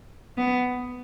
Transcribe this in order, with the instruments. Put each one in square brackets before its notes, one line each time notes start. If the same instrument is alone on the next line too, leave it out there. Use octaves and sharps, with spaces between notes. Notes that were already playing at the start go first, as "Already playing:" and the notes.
[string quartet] B3